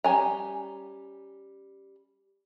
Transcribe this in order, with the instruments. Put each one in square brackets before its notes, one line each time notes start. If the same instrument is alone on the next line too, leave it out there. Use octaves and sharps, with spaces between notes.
[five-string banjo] G3 C#4 G4 G#5 A#5